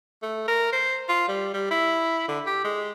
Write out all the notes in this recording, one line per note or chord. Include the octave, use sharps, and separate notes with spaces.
A3
A#4
C5
F4
G3
G3
E4
D3
G4
G#3